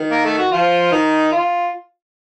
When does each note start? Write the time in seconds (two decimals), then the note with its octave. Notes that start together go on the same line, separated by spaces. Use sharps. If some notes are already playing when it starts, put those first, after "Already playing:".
Already playing: D#3
0.11 A#3
0.25 A3
0.39 F#4
0.52 F3 F4
0.92 D#3 D#4
1.32 F4